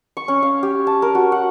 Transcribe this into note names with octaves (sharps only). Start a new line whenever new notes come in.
C#6
C#4
F5
G4
A5
A#4
F#4
F#5